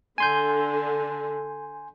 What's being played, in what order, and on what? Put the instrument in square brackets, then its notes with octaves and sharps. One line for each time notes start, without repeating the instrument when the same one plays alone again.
[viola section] D3 [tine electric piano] G#5 C6 G6